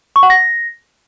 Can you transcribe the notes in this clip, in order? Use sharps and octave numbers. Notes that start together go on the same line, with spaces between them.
C#6
F#5
A#6